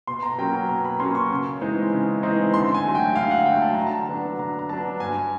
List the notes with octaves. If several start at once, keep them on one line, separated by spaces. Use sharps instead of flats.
B2 C6
A#5
F#3 A#3 C#4 G5
A#5
B2 A#5
B5
F#3 A#3 C#4 C6
C#6
C#3
E3 G#3 C4 D#4
C#3
E3 G#3 C4 D#4
D3 C6
G#5
F#3 A3
G5
D3 F5
F#5
F#3 A3 G5
A5
D3 A#5
A5
F#3 B3 D4
D3 A#5
A#5
F#3 B3 D4 A5
G2 G#5